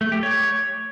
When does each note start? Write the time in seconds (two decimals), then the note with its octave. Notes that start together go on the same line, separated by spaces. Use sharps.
0.01 A3
0.12 G4
0.23 C#5